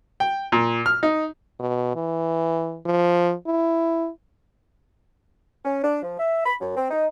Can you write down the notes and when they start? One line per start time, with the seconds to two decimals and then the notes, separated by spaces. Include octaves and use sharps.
0.20 G5
0.52 A#2
0.86 F6
1.03 D#4
1.59 B2
1.95 E3
2.86 F3
3.47 E4
5.65 C#4
5.83 D4
6.02 F3
6.19 E5
6.45 B5
6.60 F#2
6.77 C4
6.90 D#4